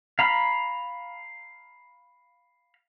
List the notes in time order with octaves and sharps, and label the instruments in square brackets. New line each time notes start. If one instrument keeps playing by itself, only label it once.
[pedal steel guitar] F5 A#5 B5